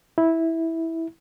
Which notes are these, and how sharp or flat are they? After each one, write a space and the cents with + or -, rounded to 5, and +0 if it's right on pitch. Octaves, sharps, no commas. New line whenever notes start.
E4 -10